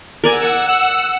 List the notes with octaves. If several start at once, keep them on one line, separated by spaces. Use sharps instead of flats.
A#4 D5 F#5 G#5 E6